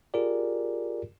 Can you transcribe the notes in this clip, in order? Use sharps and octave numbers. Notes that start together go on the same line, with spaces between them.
F4 G4 G#4 A#4 D5